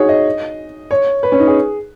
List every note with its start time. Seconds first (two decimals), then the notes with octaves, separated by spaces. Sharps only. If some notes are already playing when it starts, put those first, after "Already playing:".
Already playing: D#4 F#4 G#4 C#5
0.09 D#5
0.91 C#5
1.23 B4
1.32 C#4
1.40 D#4
1.47 G#4